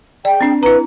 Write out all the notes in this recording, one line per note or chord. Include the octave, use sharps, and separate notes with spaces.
G#4 D5 G5
C4 D4
E4 B4 A#5